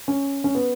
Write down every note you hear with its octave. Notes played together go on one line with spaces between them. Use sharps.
C#4
C#4
B3